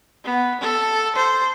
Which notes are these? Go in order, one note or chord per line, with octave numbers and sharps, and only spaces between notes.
B3
A4
C5